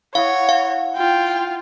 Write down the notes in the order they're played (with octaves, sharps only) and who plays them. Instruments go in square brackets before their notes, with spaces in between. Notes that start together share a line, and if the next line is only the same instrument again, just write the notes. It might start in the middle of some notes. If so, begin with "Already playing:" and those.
[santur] E4 F#5 D#6 [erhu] C#5 [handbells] F5
[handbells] F5
[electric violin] F4 [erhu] G5